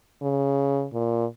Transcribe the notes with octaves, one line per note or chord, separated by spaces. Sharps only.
C#3
A#2